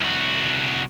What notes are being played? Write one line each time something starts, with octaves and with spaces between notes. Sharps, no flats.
C2 F#4